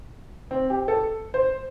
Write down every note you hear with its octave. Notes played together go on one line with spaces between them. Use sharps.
C4
G4
A4
C5